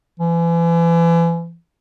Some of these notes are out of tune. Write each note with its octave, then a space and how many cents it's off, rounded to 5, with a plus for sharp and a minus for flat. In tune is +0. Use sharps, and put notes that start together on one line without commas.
E3 +35